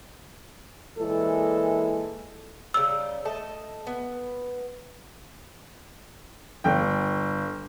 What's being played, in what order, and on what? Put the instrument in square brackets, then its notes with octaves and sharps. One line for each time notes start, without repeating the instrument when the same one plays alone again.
[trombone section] A#2 E3 G#3 A4
[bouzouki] C#3 G3 D#4 [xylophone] E6
[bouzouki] A3 D#5 A5
B3
[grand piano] G1 G5